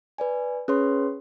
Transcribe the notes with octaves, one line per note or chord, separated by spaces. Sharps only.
B4 D5 G#5
C#4 G#4 B4 C#5 C6